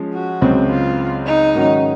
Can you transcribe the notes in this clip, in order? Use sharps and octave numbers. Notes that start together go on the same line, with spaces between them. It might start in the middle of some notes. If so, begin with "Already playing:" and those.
Already playing: F3 G#3 C#4
F#4
C#2 C#3 F#3 C4
F4
D#4
G#2 D#3 F#3 C#4 F#4